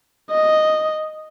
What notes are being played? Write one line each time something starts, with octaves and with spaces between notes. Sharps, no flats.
D#5